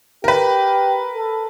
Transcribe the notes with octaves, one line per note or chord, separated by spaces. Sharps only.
G4 A#4 B4
A4